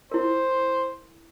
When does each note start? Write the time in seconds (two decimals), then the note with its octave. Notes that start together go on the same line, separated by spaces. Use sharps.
0.12 E4 A#4 C5